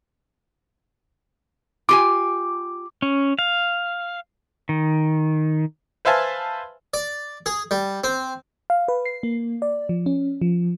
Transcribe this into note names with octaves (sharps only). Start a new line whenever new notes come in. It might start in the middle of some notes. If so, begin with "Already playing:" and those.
F4 G4 G#5 D6
C#4
F5
D#3
B4 C5 E5 F5 G#5 A5
D5
G#4
G3
C4
F5
B4
C7
A#3
D5
F3
C#4
F3